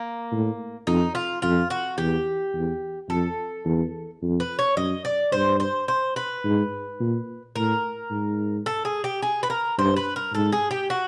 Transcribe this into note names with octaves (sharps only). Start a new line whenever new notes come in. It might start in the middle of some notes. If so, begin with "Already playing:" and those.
Already playing: A#3
A2
F2 D#4
F4
F2 F4
F#4
E2 G4
E2
F2 A4
E2
F2
B4
C#5
F#2 D#5
D5
G2 C5
C5
C5
B4
G#2
A#2
A2 A#4
G#2
A4
G#4
G4
G#4
B4
A#4
G2 C5
B4
A#4
G#2 A4
G#4
G4
F#4